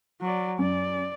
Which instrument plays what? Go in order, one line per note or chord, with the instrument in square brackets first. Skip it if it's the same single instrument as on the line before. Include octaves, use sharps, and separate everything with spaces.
[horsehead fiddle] F#3 D5
[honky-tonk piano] F#2 [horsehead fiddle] D5